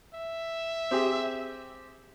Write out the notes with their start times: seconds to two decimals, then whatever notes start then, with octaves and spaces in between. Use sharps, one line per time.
0.14 E5
0.91 C4 G4 G#4